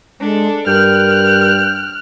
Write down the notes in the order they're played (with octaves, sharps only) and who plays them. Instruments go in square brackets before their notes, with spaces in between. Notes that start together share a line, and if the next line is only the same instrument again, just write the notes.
[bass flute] G#3 [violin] D4 A4
[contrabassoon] G2 [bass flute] A#4 [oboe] G5 [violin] F6 F#6